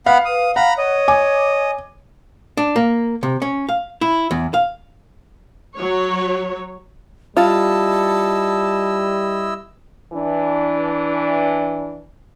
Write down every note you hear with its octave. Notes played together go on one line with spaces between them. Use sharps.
B3 F5 F#5 B5
B4 D#6
F5 F#5 A#5 B5
C#5 D#5
G#5 D6
D4
A#3
C3
C#4
F5
E4
E2
F5
F#3 C#5
G3 E4 F4 D#5 A5 E6
E3 D4